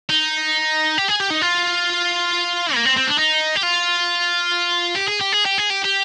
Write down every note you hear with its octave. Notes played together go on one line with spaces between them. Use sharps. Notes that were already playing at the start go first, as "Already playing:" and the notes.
D#4
G4
G#4
G4
D#4
F4
A#3
C4
C4
D4
D#4
G4
F4
G4
G#4
G4
G#4
G4
G#4
G4
G4